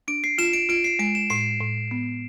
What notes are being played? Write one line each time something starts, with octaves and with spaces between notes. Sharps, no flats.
D4 D7
C7
F4 E7
D7
F4 D7
C7
G#3 D7
E7
A2 C7
A2
B3